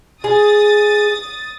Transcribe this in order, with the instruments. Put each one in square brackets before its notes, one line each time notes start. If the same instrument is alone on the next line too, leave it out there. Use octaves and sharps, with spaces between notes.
[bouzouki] G#4 [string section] D#6 A6